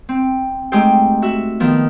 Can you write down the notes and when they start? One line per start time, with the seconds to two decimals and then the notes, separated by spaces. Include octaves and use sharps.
0.09 C4
0.72 G#3 A3 D#4 G4 C5 G5
1.22 F#4 E5
1.60 D#3 F3 B3